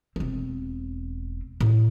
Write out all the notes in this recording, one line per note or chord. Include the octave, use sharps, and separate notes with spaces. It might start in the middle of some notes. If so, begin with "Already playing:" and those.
E1 C4
A2